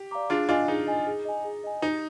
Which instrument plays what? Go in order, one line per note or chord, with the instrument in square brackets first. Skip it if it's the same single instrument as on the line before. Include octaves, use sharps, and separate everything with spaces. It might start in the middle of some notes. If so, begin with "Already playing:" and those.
Already playing: [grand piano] G4
[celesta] D5 F5 A#5 D6
[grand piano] D4 F4 [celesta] G#4
[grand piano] D4 F4 [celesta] D#5 G#5
[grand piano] D#4 [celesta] G#4
[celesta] D#5 G#5
G#4
D#5 G#5
G#4
D#5 G#5
[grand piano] D#4 [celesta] G4